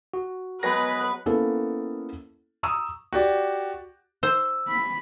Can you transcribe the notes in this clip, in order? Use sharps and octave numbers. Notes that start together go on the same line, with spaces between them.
F#4
F#3 G#3 B3 B4 A#6
A#3 B3 C#4 E4 A4
A#5 C#6 D#6 E6
F#4 G4 D5
C5 E6
B5